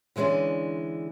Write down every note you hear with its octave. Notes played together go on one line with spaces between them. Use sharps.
D3 E3 G#3 C#4 D4